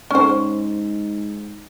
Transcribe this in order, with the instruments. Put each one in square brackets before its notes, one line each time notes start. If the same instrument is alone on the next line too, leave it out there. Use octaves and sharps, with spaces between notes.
[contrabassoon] G#2 [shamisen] C#4 C5